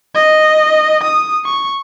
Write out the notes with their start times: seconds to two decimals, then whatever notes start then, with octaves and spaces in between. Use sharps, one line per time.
0.15 D#5
1.04 D#6
1.45 C#6